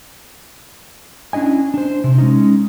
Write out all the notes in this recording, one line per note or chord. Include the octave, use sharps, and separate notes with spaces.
C#4 D4 E4 D#5 G#5
D4 C5
C3
G#3 C#4 D#4